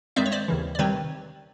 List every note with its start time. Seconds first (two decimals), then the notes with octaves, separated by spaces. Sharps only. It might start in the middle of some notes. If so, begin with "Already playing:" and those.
0.16 G2 D#3 G#3 C4 D5 E5
0.26 C#5
0.32 C5 D5
0.48 D#2 C#3 E3
0.75 D5
0.79 C3 D#3 G3 C4 B4 C#5